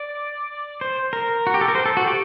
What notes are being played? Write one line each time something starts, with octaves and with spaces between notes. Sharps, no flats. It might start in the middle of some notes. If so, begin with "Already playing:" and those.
Already playing: D5
C5
A#4
F#4
G4
A4
A#4
C5
A4
F#4
G4